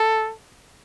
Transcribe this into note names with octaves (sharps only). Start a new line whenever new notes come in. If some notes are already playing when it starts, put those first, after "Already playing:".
Already playing: A4